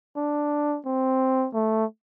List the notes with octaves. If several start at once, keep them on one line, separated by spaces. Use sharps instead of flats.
D4
C4
A3